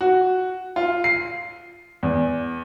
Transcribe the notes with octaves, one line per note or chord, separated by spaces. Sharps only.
F#4
F4
C7
E2